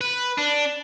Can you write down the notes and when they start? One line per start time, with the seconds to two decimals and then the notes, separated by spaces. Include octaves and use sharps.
0.01 B4
0.38 D4